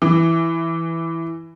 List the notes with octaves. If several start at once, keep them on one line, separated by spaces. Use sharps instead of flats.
E3